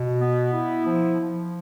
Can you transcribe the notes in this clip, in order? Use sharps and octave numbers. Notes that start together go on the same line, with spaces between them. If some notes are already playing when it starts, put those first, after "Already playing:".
Already playing: B2
B3
E4
F3
F3